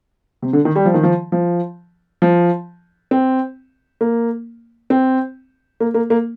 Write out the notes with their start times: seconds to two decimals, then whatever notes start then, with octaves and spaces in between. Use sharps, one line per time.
0.42 C3
0.53 D3
0.65 D#3
0.76 G3
0.86 F3
0.94 D#3
1.03 F3
1.32 F3
2.22 F3
3.11 C4
4.01 A#3
4.90 C4
5.80 A#3
5.94 A#3
6.10 A#3